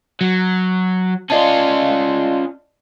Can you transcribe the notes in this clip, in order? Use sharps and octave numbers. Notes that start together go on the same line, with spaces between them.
F#3
C#4 F4 D5 D#5 A5